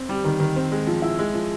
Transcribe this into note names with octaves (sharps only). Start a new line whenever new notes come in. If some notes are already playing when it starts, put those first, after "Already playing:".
Already playing: C4
G3
D#3
D#3
C4
G#3
F3
E4
G#3
F3